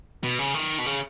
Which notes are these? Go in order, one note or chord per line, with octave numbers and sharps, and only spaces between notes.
B2
C#3
D#3
B2
C#3